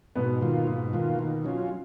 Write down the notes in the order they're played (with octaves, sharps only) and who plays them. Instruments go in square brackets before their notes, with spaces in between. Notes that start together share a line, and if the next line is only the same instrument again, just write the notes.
[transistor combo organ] G#2 [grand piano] B2 B3
[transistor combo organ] D#3 A#3 F4
G#2
D#3 A#3 F4
D#3
F#3 C#4 F4